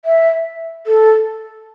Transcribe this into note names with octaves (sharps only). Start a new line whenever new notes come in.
E5
A4